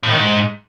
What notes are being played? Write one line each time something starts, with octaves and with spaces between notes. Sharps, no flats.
A2
D#3
G#2